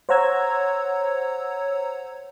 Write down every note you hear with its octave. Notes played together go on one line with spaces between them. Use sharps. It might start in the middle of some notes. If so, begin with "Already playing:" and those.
C5 C#5 F#5 A#5 E6 G#6